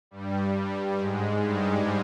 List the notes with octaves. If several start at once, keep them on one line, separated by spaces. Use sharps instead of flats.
G2 G3
G#2 G#3
G2 G3